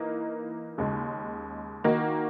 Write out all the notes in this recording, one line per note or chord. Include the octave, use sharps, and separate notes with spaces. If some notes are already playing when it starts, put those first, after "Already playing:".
Already playing: E3 A#3 D#4
D#2 C#3 G#3
D#3 A#3 D#4 F#4